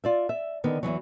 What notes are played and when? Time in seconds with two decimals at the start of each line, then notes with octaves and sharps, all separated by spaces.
0.04 F4 D5 E5
0.29 E5
0.64 D3 D#3 B3
0.83 E2 G2 E3 F#3